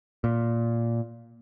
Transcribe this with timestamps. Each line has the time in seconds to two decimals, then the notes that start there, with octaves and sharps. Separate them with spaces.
0.24 A#2